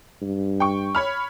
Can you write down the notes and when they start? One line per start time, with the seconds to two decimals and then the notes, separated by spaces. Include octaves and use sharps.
0.22 G2
0.60 G5 C#6
0.95 C#5 B5 F6